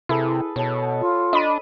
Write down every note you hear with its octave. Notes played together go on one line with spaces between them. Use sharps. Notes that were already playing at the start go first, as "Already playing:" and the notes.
C3 E4 G#4 A4 B4
B2 C#5 A5
F4
D4 D#5 B5 D#7